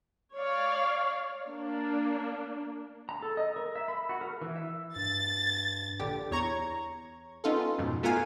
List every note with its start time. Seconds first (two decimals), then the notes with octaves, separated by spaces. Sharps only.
0.36 C#5 D5 F5
1.48 A#3 D4
3.09 A#5
3.22 A4
3.37 D#5
3.56 A#4
3.75 E5
3.88 B5
4.09 F#4
4.21 A#4
4.41 E3
4.56 E5
4.96 G2 A6
5.99 A#1 D3 G4
6.31 E2 C#5 A#5 C#6 G#6
7.44 B3 C#4 D#4 F4 A4
7.78 F2 G#2 B2
8.03 A3 B3 F4 A#4 F5 G#5